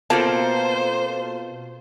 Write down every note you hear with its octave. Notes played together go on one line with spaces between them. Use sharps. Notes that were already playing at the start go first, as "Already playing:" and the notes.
B2 A#3 C4 F4 A4 C5 A5